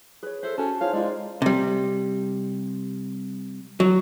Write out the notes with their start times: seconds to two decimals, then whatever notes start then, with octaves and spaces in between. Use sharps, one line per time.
0.23 G#4 B4 C#5
0.43 A4 C5 E5
0.58 C#4 F#4 A4 G#5 A5
0.81 D#4 F4 G#4 C5 C#5 F5
0.93 G#3 F4 D5
1.42 C3 G3
3.80 F#3